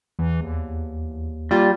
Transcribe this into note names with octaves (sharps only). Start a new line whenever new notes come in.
E2 E3
D#2
G3 A#3 F4